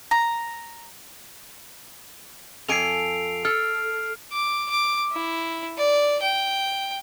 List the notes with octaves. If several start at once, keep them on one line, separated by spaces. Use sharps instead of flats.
A#5
F2 A4 G#5 C7 D7 F7
A4 F6
D6
D6
E4
D5
G5